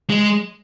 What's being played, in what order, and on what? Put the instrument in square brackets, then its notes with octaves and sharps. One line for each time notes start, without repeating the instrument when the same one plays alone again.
[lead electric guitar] G#3